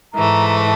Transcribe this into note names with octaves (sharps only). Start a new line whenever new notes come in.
G#2 E3 A3 A#5
A#5
A5